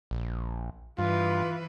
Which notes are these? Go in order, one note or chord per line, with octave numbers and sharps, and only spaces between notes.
A#1
G2 E3 F4 B4